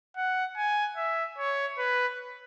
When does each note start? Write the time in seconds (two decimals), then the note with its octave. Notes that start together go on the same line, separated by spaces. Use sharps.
0.17 F#5
0.57 G#5
0.97 E5
1.38 C#5
1.78 B4